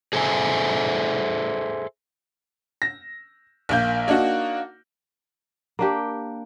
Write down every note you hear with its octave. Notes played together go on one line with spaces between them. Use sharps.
G#4 A4 C5 D5 E5 G#5
A#6
A#1 A#3 G6
A#3 D4 D#4 F#4
A#3 D4 G4